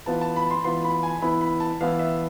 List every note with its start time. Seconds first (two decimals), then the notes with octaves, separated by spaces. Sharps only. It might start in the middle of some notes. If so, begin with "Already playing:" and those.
0.06 E3 B3 F4 A5
0.21 A5
0.36 B5
0.50 C6
0.64 E3 B3 F4 C6
0.84 B5
1.03 G#5
1.22 E3 B3 E4 B5
1.41 B5
1.60 A5
1.81 E3 B3 E4 F5
1.99 E5